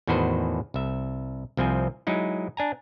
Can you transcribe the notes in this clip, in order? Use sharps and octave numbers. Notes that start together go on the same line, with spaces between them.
E2 A2 D#3 F#4 B4 C5
C2 E5
C2 F3 C4 G5 G#5
F#3 G#3 D#4 E4
D4 G#5 A#5